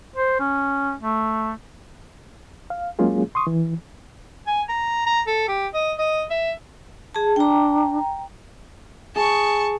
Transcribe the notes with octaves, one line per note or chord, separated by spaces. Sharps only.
C5
C#4
A3
F5
F#3 G#3 A#3 C#4 F4 G#4
C6 C#6 D#6
E3
G#5
A#5
A#5
A4
G4
D#5
D#5
E5
G#4 A5
D4 G5 A#5
G#4 A5 C#6